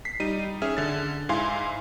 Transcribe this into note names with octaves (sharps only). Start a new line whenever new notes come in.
B6 C7
G3 D#4 D#7
C#4 G#4 E5 F6
D3 A6
G#2 E4 F5 G#5 C6